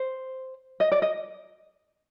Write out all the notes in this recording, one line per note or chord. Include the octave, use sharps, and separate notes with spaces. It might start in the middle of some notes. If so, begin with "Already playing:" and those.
Already playing: C5
D#5
D5
D#5